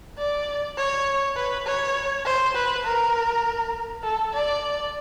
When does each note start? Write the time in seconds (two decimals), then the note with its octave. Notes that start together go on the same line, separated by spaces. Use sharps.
0.18 D5
0.77 C#5
1.36 B4
1.66 C#5
2.25 C5
2.55 B4
2.85 A#4
4.03 A4
4.33 D5